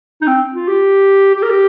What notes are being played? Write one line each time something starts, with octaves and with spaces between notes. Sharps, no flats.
D#4
C4
F4
G4
G4
A#4
G4